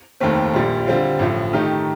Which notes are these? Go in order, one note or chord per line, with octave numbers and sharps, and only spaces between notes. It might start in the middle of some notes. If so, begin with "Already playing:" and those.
F1 D#2 D#3 A3 C4
A#1 A#2 G3
D3 G3 C4 F4
A1 A2 F3
D#3 A3 D#4 G4